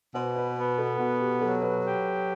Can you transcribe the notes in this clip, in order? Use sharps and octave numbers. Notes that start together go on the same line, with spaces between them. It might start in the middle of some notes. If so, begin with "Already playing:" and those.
B2 C5
B4
B3
A4
B2 F#4
G4
F#3 A4
B4
G4